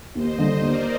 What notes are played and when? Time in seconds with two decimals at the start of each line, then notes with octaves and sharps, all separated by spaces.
0.15 D#2 C5 D#5
0.38 D3 G3 D4
0.61 D#2 A#4 D5